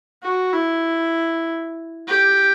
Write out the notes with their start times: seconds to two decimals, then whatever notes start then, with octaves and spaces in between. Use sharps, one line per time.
0.23 F#4
0.53 E4
2.08 G4